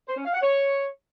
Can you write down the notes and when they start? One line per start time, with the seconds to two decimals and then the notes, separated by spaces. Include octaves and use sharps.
0.08 C5
0.17 C#4
0.25 F5
0.33 F#5
0.42 C#5